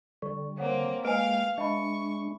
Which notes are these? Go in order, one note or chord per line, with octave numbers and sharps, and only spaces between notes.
D3 G3 C#6
A#3 C4 C#5 F#5
G#3 A#3 B4 F5 G5 G#5 F6
G#3 D4 E5 B5 C#6